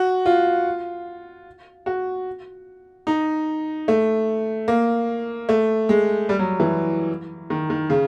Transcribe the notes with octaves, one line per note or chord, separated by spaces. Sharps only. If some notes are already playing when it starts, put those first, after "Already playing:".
Already playing: F#4
F4
F#4
D#4
A3
A#3
A3
G#3
G3
F#3
E3
D#3
D#3
C#3